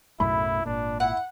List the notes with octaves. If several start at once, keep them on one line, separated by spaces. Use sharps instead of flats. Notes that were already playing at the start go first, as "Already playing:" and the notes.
B1 F#2 A2 E4 B5
G#1 A#2 D4
E4 F#5